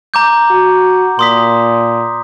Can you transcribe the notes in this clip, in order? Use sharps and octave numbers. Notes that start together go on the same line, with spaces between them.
A#5 D6 G6
F#4
A#2 C6 D#6 B6